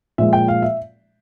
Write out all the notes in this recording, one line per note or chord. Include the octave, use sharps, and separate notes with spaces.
A#2 F3 G#3 E5
G5
F5
E5